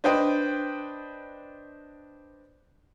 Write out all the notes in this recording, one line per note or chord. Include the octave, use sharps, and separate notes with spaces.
D4 B4 C5 D#5 G5